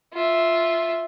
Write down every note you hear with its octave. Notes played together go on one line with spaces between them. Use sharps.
F4 E5